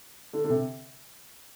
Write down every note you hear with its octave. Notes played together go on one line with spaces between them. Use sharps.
D3
D3
C3